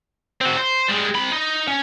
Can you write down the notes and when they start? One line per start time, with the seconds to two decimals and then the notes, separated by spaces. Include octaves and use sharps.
0.41 C4 F#4
0.57 C5
0.88 G3 G#3
1.15 C4 B5
1.32 D#4
1.68 C#4